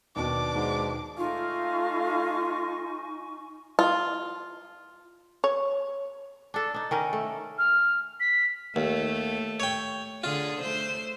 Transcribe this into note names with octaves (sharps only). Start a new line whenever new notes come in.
D#2 B2 D4 D5 D6
G#2
A3 D#4 F4 F5 G#5 C#6
F4
C#5
D4 A4
D4 D#4
D#3 C#4 A#4
A3
F6
B6
D#2 A3
C#5 G5
D3 F4 G#4
A3 C5